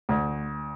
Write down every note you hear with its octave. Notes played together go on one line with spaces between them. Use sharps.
D2